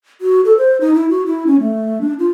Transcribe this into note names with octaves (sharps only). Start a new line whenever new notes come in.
F#4
A4
C5
D#4
E4
F#4
E4
C#4
A3
D4
F4